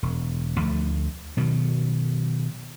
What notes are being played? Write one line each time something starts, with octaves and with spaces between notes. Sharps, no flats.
E1
D2 F3 A3
B2 D#3 F#3